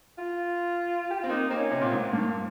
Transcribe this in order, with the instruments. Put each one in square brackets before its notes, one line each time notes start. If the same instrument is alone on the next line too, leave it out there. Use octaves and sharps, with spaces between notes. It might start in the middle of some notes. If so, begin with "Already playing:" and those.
[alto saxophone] F4
G4
[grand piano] C4 [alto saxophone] F4
[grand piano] A#3 [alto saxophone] D#4
[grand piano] A#3 [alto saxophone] C4
[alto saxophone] C#4
[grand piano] C3
[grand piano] A#2 [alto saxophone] C4
[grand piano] G#2
[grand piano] G2 [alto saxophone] A#3